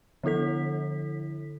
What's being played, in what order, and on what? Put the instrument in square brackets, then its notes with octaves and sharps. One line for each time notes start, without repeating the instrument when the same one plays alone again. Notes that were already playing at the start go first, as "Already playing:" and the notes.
[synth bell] D3 F3 E4 A4 B6